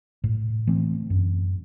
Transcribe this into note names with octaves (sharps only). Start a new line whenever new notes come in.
A2
E3 A3 C4
F#2